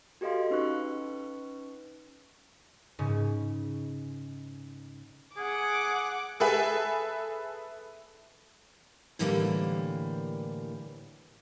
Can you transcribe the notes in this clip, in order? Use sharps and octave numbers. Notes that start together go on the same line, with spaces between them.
F#4 G4 A4 D#5 F5 C6
C#4 D#4 B4 C#6 F#6
G#2 C#3
G#4 F#5 D6
G#4 A4 B4 E5
A2 D3 E3 G3 A3 A#3